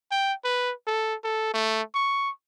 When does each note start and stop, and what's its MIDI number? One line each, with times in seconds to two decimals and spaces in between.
0.11 0.33 79
0.44 0.73 71
0.87 1.15 69
1.24 1.52 69
1.54 1.82 57
1.94 2.30 85